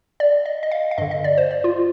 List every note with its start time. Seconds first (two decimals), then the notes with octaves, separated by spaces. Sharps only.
0.20 D5
0.45 D#5
0.63 D#5
0.71 F5
0.91 F5
0.98 G2 D3 D#5
1.11 D#5
1.24 D5
1.38 C5
1.51 D5
1.64 F4